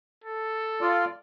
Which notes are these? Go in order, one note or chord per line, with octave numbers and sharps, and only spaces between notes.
A4
F4 D5